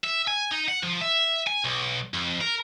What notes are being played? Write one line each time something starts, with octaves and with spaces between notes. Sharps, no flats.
E5
G#5
D#4
F#5
F3
E5
G#5
B1
F2
A#4